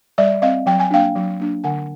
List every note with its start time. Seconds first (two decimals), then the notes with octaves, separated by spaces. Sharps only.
0.18 G3 D5 E5
0.42 C4 D#5 F5
0.66 F#3 G5
0.80 G#5
0.91 A#3 D4 F5 G5
1.15 F#3
1.39 A#3 D4
1.64 D3 F#5 G#5